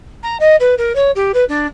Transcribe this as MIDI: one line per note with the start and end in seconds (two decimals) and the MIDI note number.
0.23 0.37 82
0.40 0.56 75
0.60 0.75 71
0.78 0.95 70
0.95 1.11 73
1.15 1.32 67
1.34 1.45 71
1.49 1.67 62